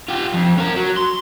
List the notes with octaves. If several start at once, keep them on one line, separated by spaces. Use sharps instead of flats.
F4 G4
F2
C#4 A#4
F#3
C6